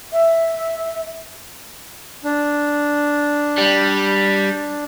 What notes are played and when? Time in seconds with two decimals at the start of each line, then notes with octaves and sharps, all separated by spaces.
0.13 E5
2.24 D4
3.58 G3